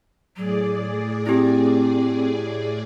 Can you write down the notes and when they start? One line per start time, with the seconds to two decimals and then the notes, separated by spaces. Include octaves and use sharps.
0.37 A2 F#3 G#4 D5
1.26 C4 E4 G4